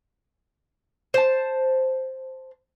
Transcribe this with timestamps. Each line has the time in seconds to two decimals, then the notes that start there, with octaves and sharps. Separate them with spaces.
1.14 C5 A5